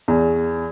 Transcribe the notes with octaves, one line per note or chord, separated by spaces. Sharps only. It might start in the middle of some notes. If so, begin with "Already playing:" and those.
E2